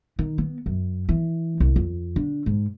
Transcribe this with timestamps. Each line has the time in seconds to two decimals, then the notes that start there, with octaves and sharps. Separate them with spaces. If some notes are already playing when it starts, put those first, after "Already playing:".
0.19 D#3
0.38 B3
0.66 F#2
1.09 E3
1.60 C2
1.76 F2
2.16 D3
2.46 G#2